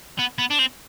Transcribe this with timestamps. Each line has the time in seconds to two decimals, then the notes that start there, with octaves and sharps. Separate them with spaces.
0.19 B3
0.39 B3
0.51 D4
0.59 C4